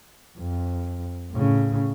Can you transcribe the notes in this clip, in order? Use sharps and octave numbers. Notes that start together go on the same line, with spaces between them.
F2
A2 C#3